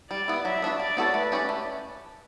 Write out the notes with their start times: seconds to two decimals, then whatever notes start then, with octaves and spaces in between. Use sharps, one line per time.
0.10 G3 D5
0.28 B3 E4
0.44 F#3 E5
0.62 B3 D4 F#4
0.79 G3 D5
0.97 B3 F#4 A4 C#5
1.14 A3 B4
1.32 C#4 G4 D5
1.49 A3